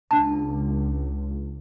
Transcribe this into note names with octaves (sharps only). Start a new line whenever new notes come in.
C#2 D4 A5